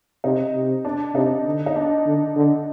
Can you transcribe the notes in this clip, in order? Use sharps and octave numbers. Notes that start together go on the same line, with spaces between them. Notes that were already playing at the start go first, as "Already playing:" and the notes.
C3 D#4
C3
D4
C3 D#4
D3
D#4
D4
D3
D3